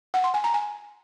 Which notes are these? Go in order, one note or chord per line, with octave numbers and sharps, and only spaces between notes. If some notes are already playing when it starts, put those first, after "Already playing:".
F#5
C6
G#5
A#5
G#5